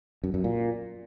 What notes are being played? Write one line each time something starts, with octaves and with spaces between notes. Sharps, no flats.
F#2
F#2
A#2